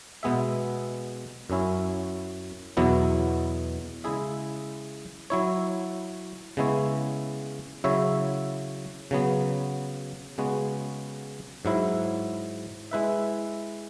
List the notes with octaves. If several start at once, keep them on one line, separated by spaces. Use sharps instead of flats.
B2 G#3 B3 G#4 E5
F#2 F#3 C#4 E4
E2 B2 F#3 B3 E4
C#3 G#3 E4 G#4 E5
F#3 E4 C#5
C#3 G#3 B3 E4 C#5
C#3 F#3 E4 C#5 E5
C#3 F#3 B3
C#3 G#3 B3 F#4
G#2 F#3 E4
G#3 E4 B4 E5